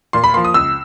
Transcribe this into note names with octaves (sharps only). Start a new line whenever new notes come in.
A#2 C6
B5
F3 A#3 C6
D#6
C#2 E6